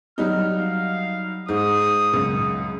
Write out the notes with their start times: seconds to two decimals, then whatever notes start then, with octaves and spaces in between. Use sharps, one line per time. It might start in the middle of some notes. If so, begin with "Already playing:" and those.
0.18 F#3 G3 D#4 F6
0.58 F5
1.49 G#2 D#6
2.13 C#2 F#2